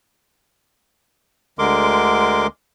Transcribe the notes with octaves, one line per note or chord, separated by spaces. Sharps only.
D2 D3 G#3 A#4 C6 D6